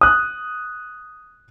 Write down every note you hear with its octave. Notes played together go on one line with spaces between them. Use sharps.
D#6 F#6